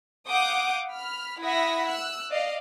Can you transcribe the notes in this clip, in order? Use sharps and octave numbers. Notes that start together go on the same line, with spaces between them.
F5 F#5 D6 D#6 G6
B5 F6
E4 E5 F#5 B5 D#6 A#6
E6 F#6
D5 D#5 F5